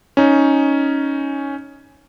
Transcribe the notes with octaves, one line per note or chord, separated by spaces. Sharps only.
C#4 D#4